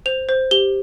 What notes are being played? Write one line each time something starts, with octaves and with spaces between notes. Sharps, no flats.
C5 F7
C5
G4 G7